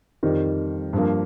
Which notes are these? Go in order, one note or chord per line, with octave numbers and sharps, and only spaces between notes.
F2 D#3 G3
G2 F3 A#3